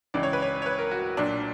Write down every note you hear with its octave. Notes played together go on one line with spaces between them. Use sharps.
C#2 C#3 E3 D5
C#5
B4
C#5
C#5
B4
A#4
F#4
B1 A#2 F#3 D4